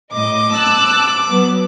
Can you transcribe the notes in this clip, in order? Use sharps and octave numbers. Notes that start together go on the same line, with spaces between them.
A2 D#5 D6
A5 E6 F#6
F#3 B3